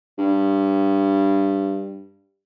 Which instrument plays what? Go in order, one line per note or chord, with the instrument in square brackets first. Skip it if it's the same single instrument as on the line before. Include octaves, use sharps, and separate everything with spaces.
[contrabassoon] G2